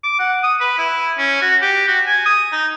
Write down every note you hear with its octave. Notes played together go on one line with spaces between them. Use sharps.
D6
F#5
D#6
B4
E4
C#4
F#4
G4
F#4
G#5
D#6
D#4